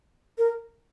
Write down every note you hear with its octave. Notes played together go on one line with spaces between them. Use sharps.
A#4